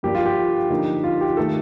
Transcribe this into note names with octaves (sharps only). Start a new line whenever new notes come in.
G2 F3 A#3 D4 G4
F4
G4
D3 F3 A#3 D#4
F4
G4
D#3 A3 D#4 A4